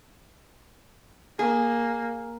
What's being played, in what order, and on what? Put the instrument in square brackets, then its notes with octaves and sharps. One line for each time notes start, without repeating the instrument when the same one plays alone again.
[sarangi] A#3 [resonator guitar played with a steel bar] G#4